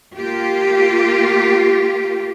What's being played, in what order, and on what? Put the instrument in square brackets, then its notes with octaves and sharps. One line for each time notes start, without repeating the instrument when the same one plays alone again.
[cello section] A#3 F4 G4